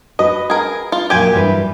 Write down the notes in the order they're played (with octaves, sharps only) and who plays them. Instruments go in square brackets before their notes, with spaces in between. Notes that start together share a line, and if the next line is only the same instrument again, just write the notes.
[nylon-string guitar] F#4 B4 [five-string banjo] D#5
[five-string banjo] G#4 A#4
F4
[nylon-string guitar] A#2 F#3 F#4 [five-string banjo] G4 G#5
[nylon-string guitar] G2 E3 B4